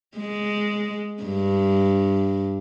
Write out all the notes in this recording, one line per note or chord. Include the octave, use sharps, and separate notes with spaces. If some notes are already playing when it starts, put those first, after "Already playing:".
G#3
G2